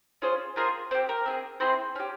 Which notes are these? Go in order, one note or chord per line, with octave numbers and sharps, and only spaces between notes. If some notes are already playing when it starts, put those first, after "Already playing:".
C#4 F4 G#4 C5
C4 F4 G#4 A#4
C4 G4 C5
A#4
C4 E4 G#4
C4 E4 G#4 C5
C#4 G4